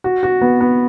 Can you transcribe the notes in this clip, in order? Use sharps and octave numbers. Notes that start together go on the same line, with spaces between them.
F#4
F#4
B3
B3